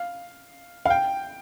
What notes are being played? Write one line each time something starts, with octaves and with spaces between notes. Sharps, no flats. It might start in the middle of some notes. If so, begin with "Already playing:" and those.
Already playing: F5
F5
G5